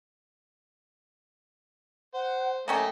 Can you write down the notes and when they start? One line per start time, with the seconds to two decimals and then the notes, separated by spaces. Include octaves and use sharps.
2.14 C5 F#5
2.68 A3 A#3 C#4 D#5 G5 G#5